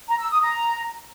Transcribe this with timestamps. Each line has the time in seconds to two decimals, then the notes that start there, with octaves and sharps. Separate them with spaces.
0.09 A#5
0.19 E6
0.30 D#6
0.41 A#5